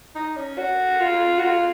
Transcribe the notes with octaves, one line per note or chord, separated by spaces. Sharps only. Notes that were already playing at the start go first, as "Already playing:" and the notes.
D#4
C#4
F#4
F4
F#4
F4